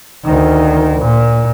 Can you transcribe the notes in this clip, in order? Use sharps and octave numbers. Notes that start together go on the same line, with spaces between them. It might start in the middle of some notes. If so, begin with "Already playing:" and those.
D2 D#3
A#2